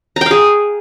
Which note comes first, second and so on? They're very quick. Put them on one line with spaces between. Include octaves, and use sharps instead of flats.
A#5 G5 F5 G#4